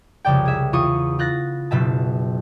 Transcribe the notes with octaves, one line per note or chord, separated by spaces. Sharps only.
C2 F2 C#3 D5 G5
G#4 E5
E2 F4 C#6 D#6
F4 F#6 A6 A#6
F#1 B2 E5 A5